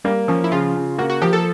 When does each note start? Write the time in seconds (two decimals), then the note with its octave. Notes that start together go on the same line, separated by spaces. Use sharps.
0.04 G3 A#3
0.28 F3 C#4
0.44 E4
0.52 C#3 F4
0.76 C#3
0.98 A#3 F#4
1.10 F#4
1.22 F3 G4
1.33 A4